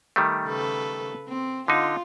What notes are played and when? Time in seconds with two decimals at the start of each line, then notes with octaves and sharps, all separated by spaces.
0.16 D#3 G3 A3
0.46 C#3 A4 B4
1.28 C4
1.68 D3 D#4 F4